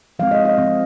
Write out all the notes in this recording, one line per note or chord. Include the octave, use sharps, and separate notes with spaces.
F3 G#3 C4 F5
D#5
D#5
F3 G#3 C4